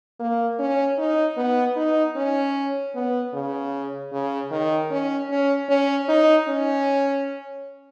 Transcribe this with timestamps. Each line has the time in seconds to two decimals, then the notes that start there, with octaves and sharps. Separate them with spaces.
0.19 A#3
0.59 C#4
0.98 D#4
1.37 B3
1.76 D#4
2.16 C#4
2.95 B3
3.33 C#3
4.12 C#3
4.51 D#3
4.90 C#4
5.30 C#4
5.69 C#4
6.09 D#4
6.48 C#4